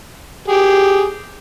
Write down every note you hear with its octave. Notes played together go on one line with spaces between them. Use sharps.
G4 G#4